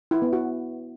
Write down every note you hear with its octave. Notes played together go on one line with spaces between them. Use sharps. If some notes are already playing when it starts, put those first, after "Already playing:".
E4
B3
F#4